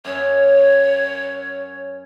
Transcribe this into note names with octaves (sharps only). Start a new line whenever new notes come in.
F#2 C#4 C#5